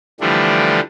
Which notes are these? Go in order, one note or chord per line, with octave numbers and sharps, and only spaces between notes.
D3 E3 F3 G3 A3 D4